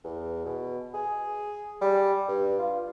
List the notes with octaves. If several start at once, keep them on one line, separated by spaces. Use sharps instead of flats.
E2
B2
G#4
G3
G2
F4